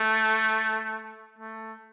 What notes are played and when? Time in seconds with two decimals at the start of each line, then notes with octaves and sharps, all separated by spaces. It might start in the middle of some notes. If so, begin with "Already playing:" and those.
Already playing: A3
1.38 A3